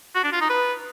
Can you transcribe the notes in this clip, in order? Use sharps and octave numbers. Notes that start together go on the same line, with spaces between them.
F#4
D4
F4
D#4
B4